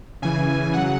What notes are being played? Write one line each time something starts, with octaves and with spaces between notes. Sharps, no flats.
C#3 E3 G#5
C#3 F#3 F#5